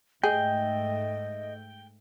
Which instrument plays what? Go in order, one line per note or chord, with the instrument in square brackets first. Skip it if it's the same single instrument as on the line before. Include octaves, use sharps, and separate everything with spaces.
[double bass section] G#2 A3 [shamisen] G#4 [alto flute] D#5 [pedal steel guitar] G5